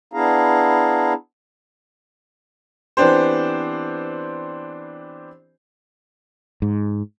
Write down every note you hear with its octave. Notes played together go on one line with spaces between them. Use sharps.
B3 D4 E4 G#4 F5 A#5
E3 B3 C4 D4 G4 C5
G#2